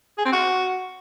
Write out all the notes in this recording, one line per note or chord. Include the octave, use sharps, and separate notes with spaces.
G#4
C4
F#4